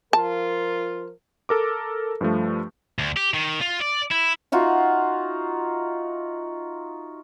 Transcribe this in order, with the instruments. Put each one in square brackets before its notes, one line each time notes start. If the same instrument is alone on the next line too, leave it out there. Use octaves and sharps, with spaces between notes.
[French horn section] F3 F4 A#4 [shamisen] A5
[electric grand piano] A4 A#4 D6
G2 F3 A3
[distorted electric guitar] D2
G4
D#3
F4
D5
E4
[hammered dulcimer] D#4 F4 F#4 E5